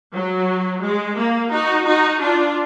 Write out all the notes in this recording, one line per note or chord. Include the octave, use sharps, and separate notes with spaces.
F#3
G#3
A#3
D#4 F#4
D#4 F#4
D4 F4